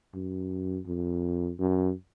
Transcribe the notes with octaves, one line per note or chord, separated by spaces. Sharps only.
F#2
F2
F#2